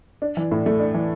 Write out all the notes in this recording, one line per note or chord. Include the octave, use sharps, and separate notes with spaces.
D4
E3
A2
A3
D4
E3